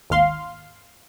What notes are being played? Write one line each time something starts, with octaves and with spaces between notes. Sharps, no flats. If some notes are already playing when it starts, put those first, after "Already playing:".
G#1 D#2 F5 C6